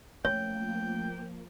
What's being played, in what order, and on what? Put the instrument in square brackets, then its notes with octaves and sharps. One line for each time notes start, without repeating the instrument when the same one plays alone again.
[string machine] F3 A#3 [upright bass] A3 C#4 [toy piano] C#5 [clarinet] G5